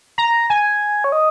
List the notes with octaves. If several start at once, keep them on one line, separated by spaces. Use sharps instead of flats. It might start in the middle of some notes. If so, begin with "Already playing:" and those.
A#5
G#5
C#5
D#5